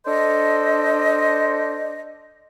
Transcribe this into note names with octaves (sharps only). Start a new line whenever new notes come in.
D4 A4 C5 D#5